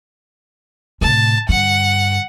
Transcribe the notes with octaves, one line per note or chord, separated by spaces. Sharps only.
A2 C3 A5
G2 D3 F#5